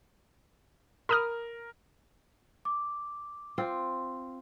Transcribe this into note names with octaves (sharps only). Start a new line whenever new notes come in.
A#4 B5 D#6 F6
D6
C4 F4